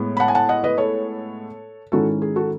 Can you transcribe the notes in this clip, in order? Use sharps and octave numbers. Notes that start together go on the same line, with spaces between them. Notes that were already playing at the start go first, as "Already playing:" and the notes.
Already playing: A2 G#3 B3
B5
F#5 A5
G#5
F#5 A5
D#5 F#5
B4 D#5
A4 C#5
G#2 D#3 G#3 C#4 E4 F#4 A4
G#4
F#4 A4